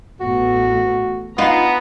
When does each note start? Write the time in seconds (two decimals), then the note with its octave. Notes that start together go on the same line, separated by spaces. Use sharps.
0.21 A1 A3 B3 F#4
1.38 B3 D#4 F4 A#5